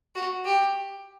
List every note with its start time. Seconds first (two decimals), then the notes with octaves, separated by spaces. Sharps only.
0.15 F#4
0.45 G4